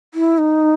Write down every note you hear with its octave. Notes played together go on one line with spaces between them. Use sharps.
E4
D#4